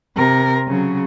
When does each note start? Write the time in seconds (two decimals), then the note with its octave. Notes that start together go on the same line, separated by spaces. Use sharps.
0.16 C3 A#4
0.68 C#3 F#3